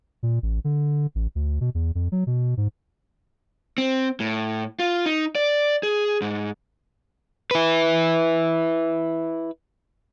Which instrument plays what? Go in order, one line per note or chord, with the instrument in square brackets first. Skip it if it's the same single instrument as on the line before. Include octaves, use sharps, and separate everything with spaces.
[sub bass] A#2
A1
D3
A1
D2
B2
E2
F2
F#3
B2
G#2
[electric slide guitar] C4
A2
F4
D#4
D5
G#4
G#2
[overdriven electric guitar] E4 B4